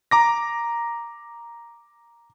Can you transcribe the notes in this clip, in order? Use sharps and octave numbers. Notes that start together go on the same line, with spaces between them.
A#5 D6 A#6